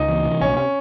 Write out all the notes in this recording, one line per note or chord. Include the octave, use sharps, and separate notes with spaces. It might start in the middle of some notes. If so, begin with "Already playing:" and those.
Already playing: C#2 D#4
E3
C3
A#1 C#4
C#4